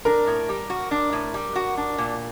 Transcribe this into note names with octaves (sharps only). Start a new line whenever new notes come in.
D4 A#4
A2
G3
F#4
D4
A2
G3
F#4
D4
A#2